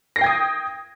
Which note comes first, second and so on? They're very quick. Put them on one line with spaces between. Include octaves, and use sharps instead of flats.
A#6 C7 G5 G#6 D#6